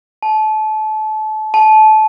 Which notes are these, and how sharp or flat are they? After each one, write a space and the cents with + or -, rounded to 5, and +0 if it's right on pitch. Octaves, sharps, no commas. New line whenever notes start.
A5 -30
A5 -25